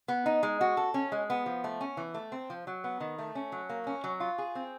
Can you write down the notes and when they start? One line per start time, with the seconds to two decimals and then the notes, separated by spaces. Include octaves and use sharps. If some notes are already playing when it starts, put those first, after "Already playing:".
0.08 B3
0.26 D#4
0.43 G#3
0.61 F#4
0.77 A4
0.94 C#4
1.12 G#3
1.30 B3
1.46 F3
1.64 A3
1.81 C#4
1.97 E3
2.14 A3
2.32 C4
2.50 F3
2.67 F#3
2.84 B3
3.00 D#3
3.19 A3
3.35 C#4
3.52 F#3
3.69 A#3
3.87 C#4
4.04 F#3
4.20 F4
4.38 G#4
4.55 C4